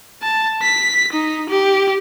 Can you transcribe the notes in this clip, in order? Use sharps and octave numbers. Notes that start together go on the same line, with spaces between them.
A5
B6
D#4
G4